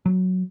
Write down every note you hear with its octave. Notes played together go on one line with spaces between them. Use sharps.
F#3